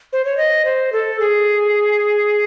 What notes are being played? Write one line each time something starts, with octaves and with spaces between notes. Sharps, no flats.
C5
C#5
D#5
C5
A4
G#4